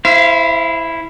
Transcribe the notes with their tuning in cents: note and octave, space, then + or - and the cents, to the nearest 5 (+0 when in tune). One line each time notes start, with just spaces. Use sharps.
E4 +0 C5 -10 F5 -35